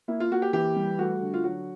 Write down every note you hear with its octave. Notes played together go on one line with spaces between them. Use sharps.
A#3 E4
F4
A#3 F#4
G4
E3 G4
G3
A3 F#4
D3
F4
F#3 F#4